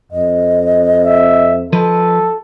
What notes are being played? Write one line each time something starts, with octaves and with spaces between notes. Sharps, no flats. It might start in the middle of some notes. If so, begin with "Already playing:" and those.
F2 D#5
E5
F3 A4 B4 D#5